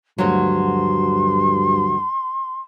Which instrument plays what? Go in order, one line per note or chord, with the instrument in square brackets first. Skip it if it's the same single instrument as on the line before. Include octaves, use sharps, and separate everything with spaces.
[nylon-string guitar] D2 F3 F#3 [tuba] G2 [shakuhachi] C6